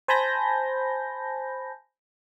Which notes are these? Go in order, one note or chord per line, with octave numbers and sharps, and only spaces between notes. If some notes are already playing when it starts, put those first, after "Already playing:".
C5 G#5 A5 B5 G6 A#6